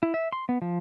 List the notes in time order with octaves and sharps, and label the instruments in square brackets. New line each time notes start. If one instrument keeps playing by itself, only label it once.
[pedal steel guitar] E4
E5
C6
B3
F3